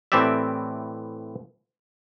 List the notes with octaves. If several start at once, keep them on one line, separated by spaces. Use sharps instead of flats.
A2 E3 C4 G4 D5 E5